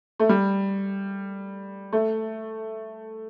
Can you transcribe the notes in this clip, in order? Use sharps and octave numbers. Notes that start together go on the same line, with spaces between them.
A3
G3
A3